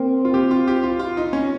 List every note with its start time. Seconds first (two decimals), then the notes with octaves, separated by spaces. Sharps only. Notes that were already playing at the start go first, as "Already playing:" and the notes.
Already playing: A#3 C4
0.25 F4
0.34 G4
0.51 F4
0.68 G4
0.83 F4
0.99 F4
1.17 D#4
1.33 C#4